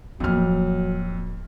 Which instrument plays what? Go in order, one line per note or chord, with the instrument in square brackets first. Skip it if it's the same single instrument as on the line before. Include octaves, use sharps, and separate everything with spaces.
[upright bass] D1 A#3 [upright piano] F2 F6 [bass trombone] F#3